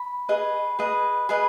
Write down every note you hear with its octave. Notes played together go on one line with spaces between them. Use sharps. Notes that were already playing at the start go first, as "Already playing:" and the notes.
Already playing: B5
G#4 B4 D#5
G#4 B4 D#5
G#4 B4 D#5